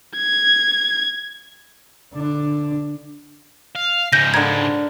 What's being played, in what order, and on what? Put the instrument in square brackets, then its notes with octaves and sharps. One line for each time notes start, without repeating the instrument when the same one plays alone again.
[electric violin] G#6
[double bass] D3 D4
[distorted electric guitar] F5
[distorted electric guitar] G#2 C#3 [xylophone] G6 A#6
[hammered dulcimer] D3 A#4 [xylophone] G#6